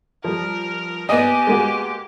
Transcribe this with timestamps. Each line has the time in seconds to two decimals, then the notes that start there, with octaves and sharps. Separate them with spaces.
0.24 F3 G3 A#4
1.09 B3 G4 D#5 G#5
1.47 G#3 A#3 F#4